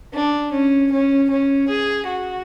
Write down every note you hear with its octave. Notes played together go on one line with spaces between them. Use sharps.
D4
C#4
C#4
C#4
G#4
F#4